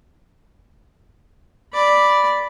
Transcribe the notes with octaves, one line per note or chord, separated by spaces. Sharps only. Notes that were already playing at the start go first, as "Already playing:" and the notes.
D5 B5